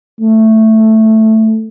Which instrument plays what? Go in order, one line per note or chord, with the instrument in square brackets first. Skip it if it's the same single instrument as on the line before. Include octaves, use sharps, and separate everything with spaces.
[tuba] A3